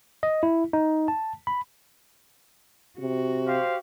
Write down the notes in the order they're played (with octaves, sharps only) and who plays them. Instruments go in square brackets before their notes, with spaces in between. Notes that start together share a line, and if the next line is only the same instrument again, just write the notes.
[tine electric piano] D#5
E4
D#4
A5
B5
[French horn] C3 [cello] F#4
[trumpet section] G4 C5 F5